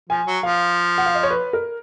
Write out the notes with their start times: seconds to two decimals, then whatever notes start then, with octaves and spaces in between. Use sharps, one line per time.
0.09 F3 G#5
0.26 F#3
0.43 F3 F5
0.98 F#5
1.06 F5
1.14 D#5
1.23 C#5
1.30 B4
1.53 A#4